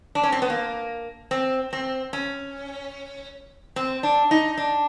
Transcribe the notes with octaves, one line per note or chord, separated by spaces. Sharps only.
D4
C#4
C4
B3
A#3
C4
C4
C#4
C4
D4
D#4
D4